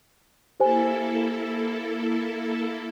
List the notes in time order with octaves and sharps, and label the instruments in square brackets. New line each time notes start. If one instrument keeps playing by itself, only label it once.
[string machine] A#3 E4 A4 [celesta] G4 C5 G#5